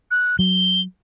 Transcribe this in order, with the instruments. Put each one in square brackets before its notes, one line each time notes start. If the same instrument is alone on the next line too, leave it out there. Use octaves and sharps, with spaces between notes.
[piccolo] F#6
[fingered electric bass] F#3 [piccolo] G7